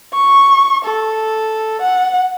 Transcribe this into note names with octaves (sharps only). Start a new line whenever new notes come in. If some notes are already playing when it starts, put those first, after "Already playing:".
C#6
A4
F#5